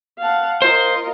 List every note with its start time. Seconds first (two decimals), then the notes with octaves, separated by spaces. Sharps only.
0.18 F5 F#5 A5
0.62 F4 A#4 C5 D#5